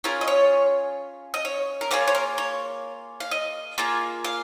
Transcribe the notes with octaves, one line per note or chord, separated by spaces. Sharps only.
C#4 F4 G#4 A#4
D#5
C#5
D#5
C#5
A#4
A#3 F4 G#4 C#5
C#5
A#4
C#5
F5
D#5
A#3 F4 G#4
F5